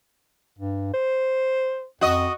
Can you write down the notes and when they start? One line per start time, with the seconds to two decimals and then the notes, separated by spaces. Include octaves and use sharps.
0.59 G2
0.94 C5
2.01 F2 F#4 D#5